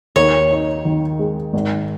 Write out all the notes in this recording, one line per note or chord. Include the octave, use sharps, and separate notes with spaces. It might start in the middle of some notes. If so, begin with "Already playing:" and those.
D#2 C#5
D#4
D#3
G#3
G#1